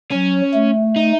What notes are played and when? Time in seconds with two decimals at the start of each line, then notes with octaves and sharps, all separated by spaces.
0.12 F#3 C#4
0.54 A3
0.96 D#4